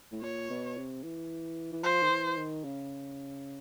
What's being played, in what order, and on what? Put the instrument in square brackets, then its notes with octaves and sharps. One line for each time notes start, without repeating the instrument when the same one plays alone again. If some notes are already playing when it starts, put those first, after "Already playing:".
[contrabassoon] A2
[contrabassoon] A#2 [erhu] C#5
[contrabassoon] B2
C3
E3
E3
[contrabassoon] F3 [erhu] C5
[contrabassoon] D#3
E3
D#3
C#3